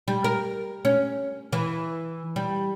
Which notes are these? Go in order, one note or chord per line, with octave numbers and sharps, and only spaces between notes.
G3
A#4
C#4
E3
G3